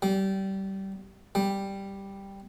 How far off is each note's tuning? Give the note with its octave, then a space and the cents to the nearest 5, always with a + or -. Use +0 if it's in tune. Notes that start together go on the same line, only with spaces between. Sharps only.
G3 -20
G3 +5